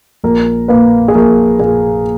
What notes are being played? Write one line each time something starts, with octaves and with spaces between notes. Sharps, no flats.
A#1 A#4
A#2 A#3 B4
G#4
A#1 A#4
A#2 A#3 G#4